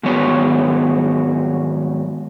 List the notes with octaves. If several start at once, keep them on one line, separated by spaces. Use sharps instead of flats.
G#2 D#3 F#3 B3 C#5